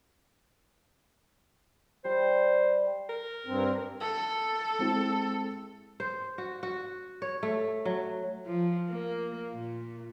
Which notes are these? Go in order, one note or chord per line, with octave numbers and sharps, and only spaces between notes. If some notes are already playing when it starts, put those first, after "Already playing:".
G3 C5
A#4
G2 C4
A4
G#3 C4 E4
C5
F#4
F#4
C#5
A3
F#3
F3
A#3
A#2